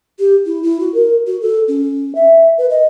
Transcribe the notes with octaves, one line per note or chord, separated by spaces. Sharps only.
G4
E4
E4
F#4
A#4
F#4
A4
C#4
E5
B4
D#5